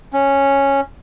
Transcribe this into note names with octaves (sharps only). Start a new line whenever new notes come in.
C#4